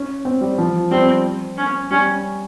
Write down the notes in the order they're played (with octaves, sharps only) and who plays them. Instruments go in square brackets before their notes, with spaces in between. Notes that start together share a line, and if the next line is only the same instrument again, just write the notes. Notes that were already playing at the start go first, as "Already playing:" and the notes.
Already playing: [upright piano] C#4
C4
G3
F3
[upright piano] G3 [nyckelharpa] C4
[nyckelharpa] C#4
[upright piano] G3 [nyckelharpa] C#4